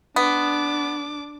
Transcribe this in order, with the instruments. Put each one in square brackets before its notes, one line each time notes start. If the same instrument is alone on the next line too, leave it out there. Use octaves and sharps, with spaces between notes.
[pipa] B3 [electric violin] D4 D6